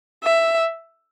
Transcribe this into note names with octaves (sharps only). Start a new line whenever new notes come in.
E5